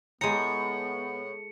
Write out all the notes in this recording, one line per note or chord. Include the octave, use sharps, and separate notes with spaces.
A2 G#3 B3 A#5 C#7